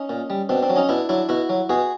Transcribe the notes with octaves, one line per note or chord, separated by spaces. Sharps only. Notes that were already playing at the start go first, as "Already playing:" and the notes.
Already playing: C#4 D#4
A#2
G3
B2 C4 D4
C4 D4
F#3
C#4 D#4
B2 D4 E4
F#3 D4 E4
B2 E4 F#4
F#3
B2 F#4 G#4